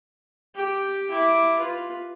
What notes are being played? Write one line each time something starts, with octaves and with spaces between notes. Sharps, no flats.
G4 G5
E4 D6
F4 B4